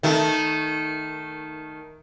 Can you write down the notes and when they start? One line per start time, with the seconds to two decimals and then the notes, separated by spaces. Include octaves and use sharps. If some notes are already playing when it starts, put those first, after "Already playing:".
0.03 D#3 A3